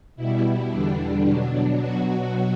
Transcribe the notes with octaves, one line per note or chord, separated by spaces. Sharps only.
B2 G3 E4
E2 D3 G3 D4
B2 F#3
B2 F#3 F#4